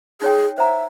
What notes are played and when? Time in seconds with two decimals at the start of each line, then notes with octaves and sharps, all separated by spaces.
0.22 D#4 G#4 C#5 G5
0.58 C5 E5 F#5 A#5